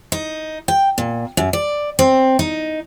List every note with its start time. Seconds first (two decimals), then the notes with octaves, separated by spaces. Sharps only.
0.12 D#4
0.68 G5
0.98 A#2
1.37 F#2
1.53 D5
1.99 C4
2.39 D#4